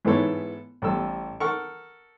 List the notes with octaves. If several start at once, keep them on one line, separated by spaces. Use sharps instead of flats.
G#2 E3 B3 A4 C#5
A1 G3 A4 E6
A4 A#4 F#5 C#6